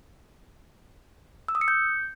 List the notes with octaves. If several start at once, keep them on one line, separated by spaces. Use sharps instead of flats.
E6
D#6
C#7
G6